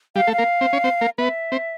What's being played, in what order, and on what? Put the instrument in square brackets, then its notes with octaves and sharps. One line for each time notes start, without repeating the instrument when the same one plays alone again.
[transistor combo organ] G3 G4 [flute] F5
[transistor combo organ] A3 A4
[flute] F5
[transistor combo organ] A#3 A#4
C4 C5
C#4 C#5
C4 C5
A#3 A#4
[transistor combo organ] B3 B4 [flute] E5
[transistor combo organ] C4 C5